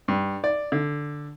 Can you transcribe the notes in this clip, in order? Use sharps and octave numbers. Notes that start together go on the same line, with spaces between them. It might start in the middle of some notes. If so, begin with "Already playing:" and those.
G2
D5
D3